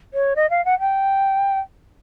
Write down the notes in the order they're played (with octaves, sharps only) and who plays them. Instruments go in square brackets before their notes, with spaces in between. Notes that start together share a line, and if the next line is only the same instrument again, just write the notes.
[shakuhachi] C#5
D#5
F5
F#5
G5